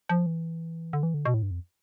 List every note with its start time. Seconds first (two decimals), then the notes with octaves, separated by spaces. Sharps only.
0.09 F3
0.26 E3
0.93 D3
1.03 E3
1.14 D3
1.25 B2
1.34 A2
1.43 G2
1.51 F2